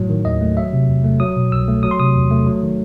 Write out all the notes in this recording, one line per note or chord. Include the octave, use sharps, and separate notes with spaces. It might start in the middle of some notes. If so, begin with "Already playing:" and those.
Already playing: A2 F#3
D#3
D#2 D#5
A3
F#3 E5
C3
E2
A3
F#3 D#6
B2
C2 E6
A3
F#3 D#6
C6
C3 D#6
E2
A3
F#3
D#3